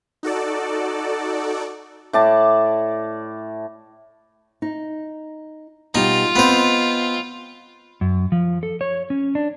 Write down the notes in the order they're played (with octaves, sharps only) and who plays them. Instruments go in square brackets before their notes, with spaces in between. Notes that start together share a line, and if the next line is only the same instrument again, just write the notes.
[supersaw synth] D#4 F#4 A4 D5
[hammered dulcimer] A2 D5 A5
[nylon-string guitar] D#4
[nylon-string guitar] B2 G3 [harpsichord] D#4 [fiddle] F4
[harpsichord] B3 C5 [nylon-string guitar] C4 D#5
[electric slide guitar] F#2
F3
A4
C#5
C#4
D4